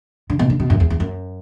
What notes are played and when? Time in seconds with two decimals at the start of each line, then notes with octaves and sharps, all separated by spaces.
0.30 D3
0.39 B2
0.50 D3
0.60 B2
0.70 F#2
0.80 E2
0.90 E2
1.00 F#2